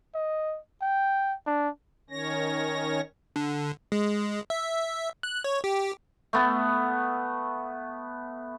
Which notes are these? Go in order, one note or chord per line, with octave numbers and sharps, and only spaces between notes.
D#5
G5
D4
D#3 C#4 C#5 A#6
D3
G#3
E5
F#6
C#5
G4
A3 B3